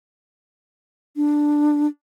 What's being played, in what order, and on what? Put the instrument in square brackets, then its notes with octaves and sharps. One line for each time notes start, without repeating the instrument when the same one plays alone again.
[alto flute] D4